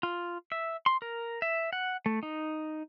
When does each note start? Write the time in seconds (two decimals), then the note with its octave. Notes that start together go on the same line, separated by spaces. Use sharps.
0.03 F4
0.52 E5
0.86 C6
1.02 A#4
1.42 E5
1.73 F#5
2.06 A3
2.23 D#4